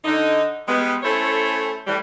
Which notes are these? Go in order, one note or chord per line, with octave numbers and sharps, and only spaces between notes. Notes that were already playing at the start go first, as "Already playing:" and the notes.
D3 D#4
G3 G#3 B3
A3 C#4 E4 A4 C5 C#5
A2 E3 G3